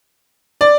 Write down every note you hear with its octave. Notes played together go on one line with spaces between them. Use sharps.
D5